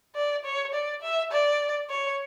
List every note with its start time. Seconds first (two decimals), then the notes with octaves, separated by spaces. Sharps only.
0.15 D5
0.45 C#5
0.74 D5
1.02 E5
1.32 D5
1.90 C#5